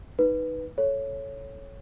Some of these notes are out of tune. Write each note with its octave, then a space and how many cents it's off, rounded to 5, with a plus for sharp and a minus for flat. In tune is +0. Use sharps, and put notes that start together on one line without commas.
D#4 +0 B4 +0
A4 -5 C#5 +0